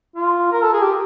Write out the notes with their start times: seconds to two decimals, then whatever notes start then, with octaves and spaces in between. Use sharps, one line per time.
0.16 F4
0.52 A#4
0.63 A4
0.73 G#4
0.82 G4